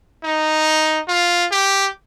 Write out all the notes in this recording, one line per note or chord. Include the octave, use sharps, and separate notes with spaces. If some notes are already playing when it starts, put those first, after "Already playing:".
D#4
F4
G4